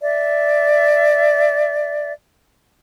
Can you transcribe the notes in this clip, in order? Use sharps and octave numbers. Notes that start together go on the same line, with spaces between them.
D5 E5